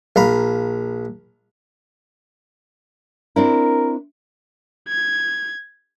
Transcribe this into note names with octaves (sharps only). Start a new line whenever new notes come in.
A#1 F5 A#5 B5
C4 D4 E4 A#4
G#6